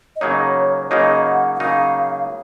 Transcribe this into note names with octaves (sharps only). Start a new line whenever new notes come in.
D#5
C#3 F#3 A#3 D#4 C#5
C#3 F#3 A#3 D#4 D#5
F#5
F#5
C#3 F#3 A#3 D#4 F5